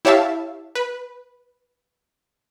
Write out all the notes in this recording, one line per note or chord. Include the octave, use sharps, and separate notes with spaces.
E4 G4 C#5 E5 F5 A5
B4